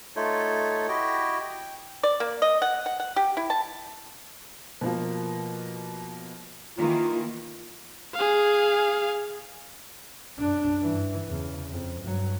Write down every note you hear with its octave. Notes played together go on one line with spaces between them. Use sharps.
A3 D#4 F4 A4 C#5
E4 F#4 G4 D#5 G5
G5
D5
A#3
D#5
F#5
F#5
F#5
G4
E4
A5
B2 F3 A#3
D#3 E3 A#3 F4
G#4 F5
F#2 D4
G2 E3
E2 C#3
F2
G2 F#3